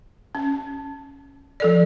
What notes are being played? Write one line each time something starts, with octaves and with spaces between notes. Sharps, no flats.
C#4
F3 A4 D5